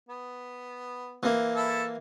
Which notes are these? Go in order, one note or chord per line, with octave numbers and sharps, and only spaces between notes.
B3
E3 A#3
E4 A4